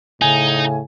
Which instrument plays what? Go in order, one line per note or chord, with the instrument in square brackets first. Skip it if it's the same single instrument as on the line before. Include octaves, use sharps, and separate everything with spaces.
[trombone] A2 [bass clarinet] C#3 [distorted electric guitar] D#4 [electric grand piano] G#5